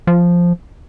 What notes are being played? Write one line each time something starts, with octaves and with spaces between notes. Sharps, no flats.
F3